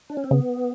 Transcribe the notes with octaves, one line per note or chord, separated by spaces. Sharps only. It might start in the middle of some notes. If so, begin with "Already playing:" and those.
D4
C#4
C4
C#3 B3